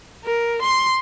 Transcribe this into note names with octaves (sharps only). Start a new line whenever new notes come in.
A#4
C6